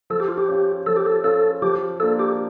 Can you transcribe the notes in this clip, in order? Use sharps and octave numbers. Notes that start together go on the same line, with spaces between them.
F3 A4
G4
F4
G4
C#4 F4
F3 A4
G4
A4
C#4 F4 A4
F3 G4
A#3 D4 F4 A4
G4